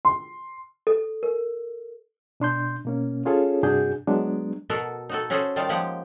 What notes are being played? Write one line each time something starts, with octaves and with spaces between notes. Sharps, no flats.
C6
A4
A#4
B2 D4 C6 G6
B2 A#3 C#4
C#4 F4 G#4 A4 C#5
G2 C3 D4 F#4 G#4 G6
F#3 G#3 B3 D4
B2 F#4 A4 A#4
D#4 F#4 A4
C#4 F#4 G#4 A4 C5
D#3 G3 D#4 F4 A#4 A5
F3 G#3 A#3 G4 F#5